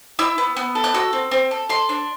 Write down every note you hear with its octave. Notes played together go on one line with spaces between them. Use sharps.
E4 E6
B3
B3
A4
F#6
F#4 E6
C4
C4
A4
A4 C6
D4